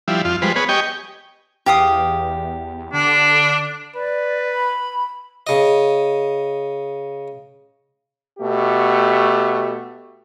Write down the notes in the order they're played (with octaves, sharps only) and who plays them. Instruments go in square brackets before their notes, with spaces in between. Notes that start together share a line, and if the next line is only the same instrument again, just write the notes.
[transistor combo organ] F3 G3 E4
F2 F4
F3 G3 G#3 B4 C5
B3 G#4 B4 C#5
G4 D#5 G5 G#5 C#6
[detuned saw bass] E2 [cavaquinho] G4 F5 D#6
[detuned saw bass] D3 [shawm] D4
[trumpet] B4 [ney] D5
[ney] B5
[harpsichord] C#3 D#5
[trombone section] B2 A3 G4